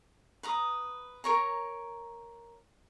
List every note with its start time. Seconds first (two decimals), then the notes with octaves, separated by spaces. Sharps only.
0.43 B4 A#5 D#6
1.24 A#4 C#5 A#5